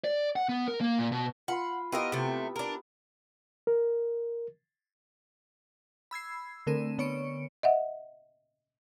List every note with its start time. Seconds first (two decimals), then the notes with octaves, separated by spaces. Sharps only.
0.04 D5
0.36 F#5
0.49 B3
0.68 A#4
0.81 A#3
0.99 A#2
1.12 B2
1.48 F4 F#5 B5 C6
1.92 B3 E4 F4 G4 A#4 D#5
2.12 C3 A3
2.56 D4 A#4
3.67 A#4
6.11 B5 E6 G#6 C7
6.67 D3 A3 C4 A#4 D#7 E7
6.98 D3 B3 C#5 C#6 C#7 D7
7.63 D#5 E5 F#5